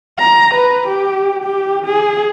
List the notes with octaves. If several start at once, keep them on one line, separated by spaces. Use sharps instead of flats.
A#5
B4
G4
G4
G#4